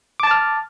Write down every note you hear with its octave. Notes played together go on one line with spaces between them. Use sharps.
A5 D6 F6 A6